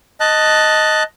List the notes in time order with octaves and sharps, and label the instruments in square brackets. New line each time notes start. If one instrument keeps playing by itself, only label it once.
[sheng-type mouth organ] D#5 A5 F#6